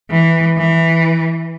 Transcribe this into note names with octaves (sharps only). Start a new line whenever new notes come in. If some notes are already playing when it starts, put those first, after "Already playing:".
E3
E3